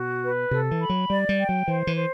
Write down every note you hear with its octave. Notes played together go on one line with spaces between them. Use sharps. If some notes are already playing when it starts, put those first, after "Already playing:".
Already playing: B2 F#4
B4
C3 A4
E3
B5
F#3
G3 D5
G3
G5
F#3
E3 C5
E3
C5